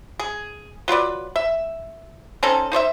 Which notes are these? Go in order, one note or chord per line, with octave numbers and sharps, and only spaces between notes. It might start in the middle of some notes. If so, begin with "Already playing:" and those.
G#4
F#3 F4 B4 D5
E5
C4 C#4 D#4 A4
D#4 C5 C#5 E5